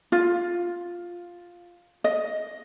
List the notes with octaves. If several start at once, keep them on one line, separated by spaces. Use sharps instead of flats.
F4
D#5